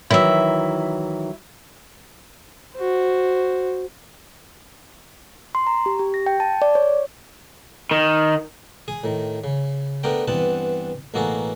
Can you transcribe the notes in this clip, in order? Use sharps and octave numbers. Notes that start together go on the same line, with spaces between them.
D#3 E3 F#3 E4 E5
F#4 C5
C6
A#5
G4
G4
A#6
G5
A5
D5
C#5
D#3
G#4 G#5
A2 D#3
C#3
A3 B3 D4 A#4 G5
G2 E3 B3 C4 F#5 A5
A1 B2 A#3 F#4 G#4 A4